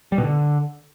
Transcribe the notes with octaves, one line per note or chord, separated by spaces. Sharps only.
G3
B2
D3